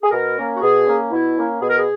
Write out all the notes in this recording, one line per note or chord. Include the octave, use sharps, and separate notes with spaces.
G#4
B2 A#4
A#3 C#4
F#4
B2 G#4
A#3 C#4
B2 E4
A#3 C#4
B2 G#4
A#4
G#4